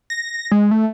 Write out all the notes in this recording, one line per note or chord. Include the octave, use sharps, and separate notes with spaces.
A#6
G#3
A3